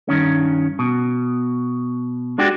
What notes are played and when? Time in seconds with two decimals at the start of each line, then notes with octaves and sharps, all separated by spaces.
0.09 G2 D#3 C#4
0.79 B2
2.38 G#3 D4 F#4 G4